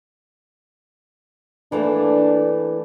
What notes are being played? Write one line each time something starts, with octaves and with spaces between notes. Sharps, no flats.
E3 A3 A#3 D4